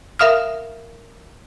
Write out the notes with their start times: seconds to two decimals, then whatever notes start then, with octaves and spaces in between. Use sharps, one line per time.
0.19 A#4 E5 F5 D#6 F6